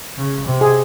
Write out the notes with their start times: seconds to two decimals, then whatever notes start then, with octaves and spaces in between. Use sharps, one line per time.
0.18 C#3
0.47 C3
0.61 G#4